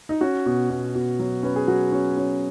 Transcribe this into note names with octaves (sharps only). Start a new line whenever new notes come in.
D#4
C#4 F#4
B2
B2
B2
F#3
C#4 B4
G#4
F#3 F#4
C#4
C#4